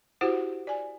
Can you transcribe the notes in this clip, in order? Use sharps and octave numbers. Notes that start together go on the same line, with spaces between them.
E4 F#4 G4 C5 F#5
D5 G#5